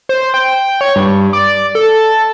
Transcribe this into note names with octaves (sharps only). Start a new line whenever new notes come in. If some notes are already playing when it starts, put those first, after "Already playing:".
C5
G5
C#5
G2
D5
A4